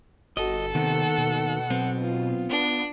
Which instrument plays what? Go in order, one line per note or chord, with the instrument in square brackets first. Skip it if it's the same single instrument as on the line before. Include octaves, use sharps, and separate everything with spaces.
[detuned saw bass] G1 [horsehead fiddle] F#4 [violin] A4 [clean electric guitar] D#5
[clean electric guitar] D#2 D#3 B3 [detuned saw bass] C3 [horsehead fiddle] F#5
[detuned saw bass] B2
[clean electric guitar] B1 B3 C4
[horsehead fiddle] F4
[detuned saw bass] B3 [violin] D4